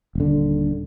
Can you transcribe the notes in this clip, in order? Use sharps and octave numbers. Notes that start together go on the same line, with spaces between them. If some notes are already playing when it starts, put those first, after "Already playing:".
D#1 D3